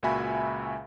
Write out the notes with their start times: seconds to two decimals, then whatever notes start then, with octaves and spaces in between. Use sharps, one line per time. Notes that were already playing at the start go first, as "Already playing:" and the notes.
0.03 C#2 A#2 F#4 E5 G#5 B5